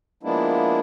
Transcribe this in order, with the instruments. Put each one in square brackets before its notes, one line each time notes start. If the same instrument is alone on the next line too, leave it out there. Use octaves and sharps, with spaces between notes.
[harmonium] F3 G#3 A#3 B3 D4 E4